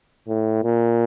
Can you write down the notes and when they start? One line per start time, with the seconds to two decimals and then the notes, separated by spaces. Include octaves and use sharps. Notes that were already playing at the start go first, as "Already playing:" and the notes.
0.29 A2
0.64 A#2